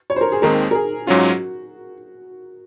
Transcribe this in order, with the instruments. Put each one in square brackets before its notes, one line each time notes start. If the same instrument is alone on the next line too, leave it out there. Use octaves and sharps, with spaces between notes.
[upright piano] C#5
C5
A#4
G#4
[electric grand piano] D#2 D#3 G#3 C4 [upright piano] A#4
[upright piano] A#4
G#4
[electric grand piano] G#2 F#3 C#4 F4 [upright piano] F#4